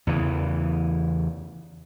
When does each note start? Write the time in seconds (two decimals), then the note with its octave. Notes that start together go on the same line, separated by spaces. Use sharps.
0.07 E2 C#3 E3